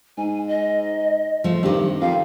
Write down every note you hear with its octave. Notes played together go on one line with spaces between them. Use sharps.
G#2 G#5
D#5
F3 A3
G2 D#3 C4 G4
F2 F5